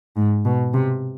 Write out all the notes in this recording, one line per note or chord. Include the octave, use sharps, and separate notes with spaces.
G#2
B2
C3